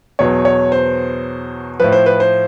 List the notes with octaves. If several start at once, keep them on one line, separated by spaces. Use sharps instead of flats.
E2 B2 F#3 C#5
C#5
C5
A2 F3 B4
C5
B4
C5